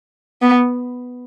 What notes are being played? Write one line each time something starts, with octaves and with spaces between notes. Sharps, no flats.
B3